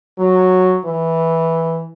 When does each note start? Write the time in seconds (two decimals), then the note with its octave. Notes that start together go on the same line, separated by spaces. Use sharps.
0.19 F#3
0.85 E3